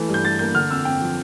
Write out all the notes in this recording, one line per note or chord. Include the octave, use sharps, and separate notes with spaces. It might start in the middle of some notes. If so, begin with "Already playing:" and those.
Already playing: E3 A3
G2
G6
G2 A6
A#3 G6
D3 F6
F2 E6
C4 G5
F3